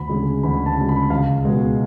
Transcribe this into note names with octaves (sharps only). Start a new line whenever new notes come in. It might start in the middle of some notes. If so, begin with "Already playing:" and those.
Already playing: D2 B5
C#3 G#3
D2 B5
A5
C#3 G#3
B5
C#2 F5
B2 G#3